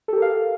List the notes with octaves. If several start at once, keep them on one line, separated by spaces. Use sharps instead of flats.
G4 A4 A#4 F5